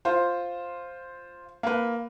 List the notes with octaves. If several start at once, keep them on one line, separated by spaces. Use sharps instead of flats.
F4 C5
A#3 B4